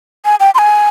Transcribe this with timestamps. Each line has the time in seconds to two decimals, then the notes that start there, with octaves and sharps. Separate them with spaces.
0.25 G#5
0.40 G5
0.55 C6
0.58 G#5